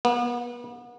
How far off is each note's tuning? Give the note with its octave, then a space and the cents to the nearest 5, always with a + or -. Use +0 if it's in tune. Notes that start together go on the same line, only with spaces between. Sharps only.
B3 -35